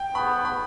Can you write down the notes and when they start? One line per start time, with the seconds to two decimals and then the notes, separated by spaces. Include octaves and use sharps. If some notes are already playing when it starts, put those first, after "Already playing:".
Already playing: G5
0.14 B3 B5
0.45 B5